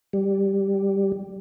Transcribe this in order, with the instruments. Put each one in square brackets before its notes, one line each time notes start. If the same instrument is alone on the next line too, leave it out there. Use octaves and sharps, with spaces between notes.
[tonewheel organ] G3